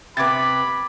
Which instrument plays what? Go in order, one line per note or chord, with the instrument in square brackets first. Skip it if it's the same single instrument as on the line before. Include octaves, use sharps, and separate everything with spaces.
[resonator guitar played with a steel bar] C3 B3 [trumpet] B5 [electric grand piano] D6 G#6 A6